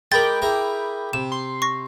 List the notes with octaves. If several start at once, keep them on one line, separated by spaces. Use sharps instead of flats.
G#3 A#4 G5 B5 D6 A6
E4 G#4 A#4
C3 E7
C6
C#6 A#6